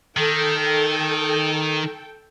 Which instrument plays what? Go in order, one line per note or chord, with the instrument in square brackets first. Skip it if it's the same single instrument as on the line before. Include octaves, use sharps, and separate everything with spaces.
[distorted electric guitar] D#3 [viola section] A4 G5